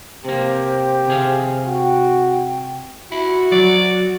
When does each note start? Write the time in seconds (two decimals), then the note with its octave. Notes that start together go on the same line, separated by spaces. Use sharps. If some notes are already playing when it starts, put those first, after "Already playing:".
0.25 C3 A#3 G4 C5
1.08 C3 G#4 F5
1.65 F#4 G5
3.12 E4 F#4
3.52 F#3 D5